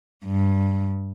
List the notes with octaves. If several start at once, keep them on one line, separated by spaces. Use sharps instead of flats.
G2